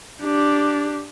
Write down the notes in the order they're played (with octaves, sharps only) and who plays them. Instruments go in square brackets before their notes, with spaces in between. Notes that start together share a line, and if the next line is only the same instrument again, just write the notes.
[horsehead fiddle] D4 G4